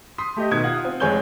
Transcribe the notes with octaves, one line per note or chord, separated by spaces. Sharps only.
C6 D#6 B6
A3 G4 D#5
B2 D#3 D#5 G#6
F4 F#5
C4
F1 G#3 C#5 G#5 G6 G7